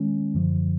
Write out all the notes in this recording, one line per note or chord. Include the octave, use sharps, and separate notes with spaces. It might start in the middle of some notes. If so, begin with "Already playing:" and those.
Already playing: D#3 G#3 C#4
F#2 D3 F3